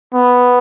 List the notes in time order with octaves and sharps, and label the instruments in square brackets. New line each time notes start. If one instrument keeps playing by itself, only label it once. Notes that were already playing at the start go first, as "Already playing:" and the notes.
[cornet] B3